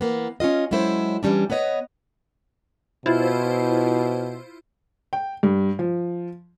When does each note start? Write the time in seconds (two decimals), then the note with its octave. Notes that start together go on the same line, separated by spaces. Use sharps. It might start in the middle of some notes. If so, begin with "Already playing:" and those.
0.01 E3 A#3 B3
0.40 C#4 D4 F4 D#5
0.71 F#3 G#3 C#4 E4 A4 C5
1.23 E3 F#3 G3 C#4 D4
1.50 B3 B4 C#5 D#5
3.06 B2 E4 F4 C5
5.13 G5
5.43 G2
5.79 F3